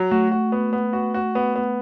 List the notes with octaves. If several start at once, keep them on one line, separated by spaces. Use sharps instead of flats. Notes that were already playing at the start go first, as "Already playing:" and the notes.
Already playing: F#3
A3 F#4
F#4
B3
B3
F#4
F#4
B3
B3